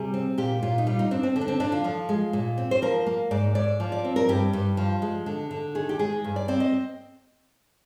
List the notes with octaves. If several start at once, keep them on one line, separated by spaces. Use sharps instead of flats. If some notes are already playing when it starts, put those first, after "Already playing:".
Already playing: C3 G3 G#4
C4
A#2 G4
A#2 F4
D#4
G3 F4
D#4
C4 D4
C4
D3
D4
C4
D3 D4
F4
F3
G#3
A#2
C4
C5
F3 A#4
A#3
G#2 D5
G#2 D5
F3
D5
C4
A#4
G2 G4
G2
F3
G#3
D3
D3
D#3 G#4
G4
G#3 G#4
G2
D5
C4 D5
D#5